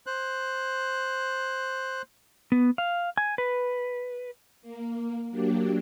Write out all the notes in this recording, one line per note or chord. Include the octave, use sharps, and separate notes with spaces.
C5 F#6
B3
F5
G#5
B4
A#3
F#3 A#3 D4 G4